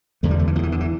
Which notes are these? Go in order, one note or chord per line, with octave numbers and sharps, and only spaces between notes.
E2 D3 A3
G3
A3
E3
E2 D3 F3
E3
D3
E3